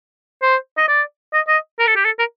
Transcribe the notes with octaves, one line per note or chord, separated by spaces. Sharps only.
C5
D#5
D5
D#5
D#5
A#4
A4
G4
A4
A#4